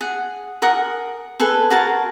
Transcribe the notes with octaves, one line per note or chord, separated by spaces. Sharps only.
G#4 F#5
G#4 A#4 F#5 D#6
G#4 A4 B4 G#5
F#4 G#4 A#4 A5